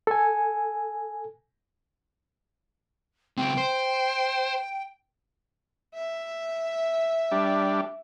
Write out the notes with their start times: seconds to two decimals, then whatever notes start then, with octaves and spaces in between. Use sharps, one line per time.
0.07 A4 G#5
3.37 C#2 C4 G5
3.58 C5
5.95 E5
7.32 G3 D4